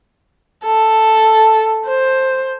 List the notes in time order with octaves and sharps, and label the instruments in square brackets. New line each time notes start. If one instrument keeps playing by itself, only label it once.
[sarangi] A4
C5